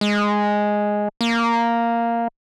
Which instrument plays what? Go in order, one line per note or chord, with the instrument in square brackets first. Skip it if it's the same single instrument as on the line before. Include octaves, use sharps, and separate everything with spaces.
[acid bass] G#3
A#3